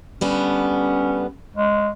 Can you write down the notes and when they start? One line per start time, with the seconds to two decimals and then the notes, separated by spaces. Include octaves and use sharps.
0.21 D3 G3 B3 C#4
1.56 G#3